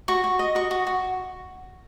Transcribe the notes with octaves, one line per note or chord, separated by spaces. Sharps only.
F#4 C#6
F#4
D#5
F#4 C#6
F#4
F#4